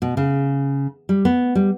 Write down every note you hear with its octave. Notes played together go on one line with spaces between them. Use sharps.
B2
C#3
G3
B3
G3